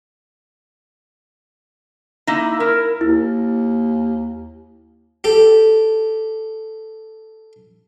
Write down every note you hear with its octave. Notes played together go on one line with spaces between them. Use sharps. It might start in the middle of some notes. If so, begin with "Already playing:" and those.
A#3 D#4 E4
E4 A#4
D#2 E4
G4 A4